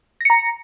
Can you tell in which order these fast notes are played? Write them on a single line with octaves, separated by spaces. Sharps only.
A#6 C#7 A#5